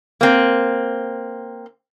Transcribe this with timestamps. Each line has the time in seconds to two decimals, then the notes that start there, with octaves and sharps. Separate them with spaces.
0.21 A#3 C4